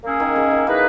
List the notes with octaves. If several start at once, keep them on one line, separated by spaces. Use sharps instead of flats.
A#3 C#4 E4 G#4
D#3
C#3
D#3
E3 A#3 D#4 G#4 B4